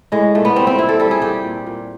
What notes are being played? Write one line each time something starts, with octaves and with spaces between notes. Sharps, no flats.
A2 G#3
A#2 A3
B3
G3 C4
C4
A#2 E4
A4
G3 A4
G#4
G3 G4
A#2
A#2